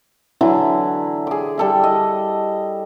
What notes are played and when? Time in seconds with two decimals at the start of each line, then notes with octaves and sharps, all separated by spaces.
0.41 D3 E3 F#3 E4
1.27 G#4 D6
1.57 G3 A4 E5
1.83 D#5